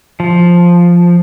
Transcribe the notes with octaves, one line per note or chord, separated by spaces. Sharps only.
F3